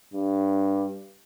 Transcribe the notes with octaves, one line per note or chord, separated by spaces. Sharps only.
G2